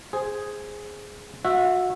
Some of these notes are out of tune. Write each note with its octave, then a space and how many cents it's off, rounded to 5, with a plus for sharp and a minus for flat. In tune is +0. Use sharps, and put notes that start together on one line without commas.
G#4 +0 C5 +0
F#4 -30 E5 +0